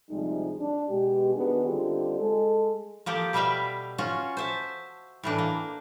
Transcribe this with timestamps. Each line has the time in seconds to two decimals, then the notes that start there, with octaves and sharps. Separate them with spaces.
0.10 D2 C3 F3 G3 G#3 D#4
0.60 D4
0.89 B2 G#3 G4
1.34 D#3 B3 D4 F#4 G#4
1.65 D3 G3 C4 D#4 F4 G4
2.19 G#3 G#4 A4
3.06 F3 A#3 G4 A4
3.33 B2 G3 B4 E5 F5 G5
3.98 C#4 F4 F#4
4.37 C5 E5 A5
5.23 A2 E3 D4
5.38 A#3